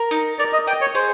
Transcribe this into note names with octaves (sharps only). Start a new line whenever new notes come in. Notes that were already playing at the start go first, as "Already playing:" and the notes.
Already playing: A#4
D#4
A#4 D5
D#5
D#5 G5
C#5
G#4 C5